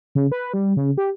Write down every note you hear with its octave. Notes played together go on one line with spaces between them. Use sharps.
C#3
B4
G3
C#3
G4